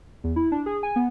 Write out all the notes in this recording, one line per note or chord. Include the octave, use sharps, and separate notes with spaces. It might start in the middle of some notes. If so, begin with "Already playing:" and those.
E2
E4
D4
G#4
G#5
B3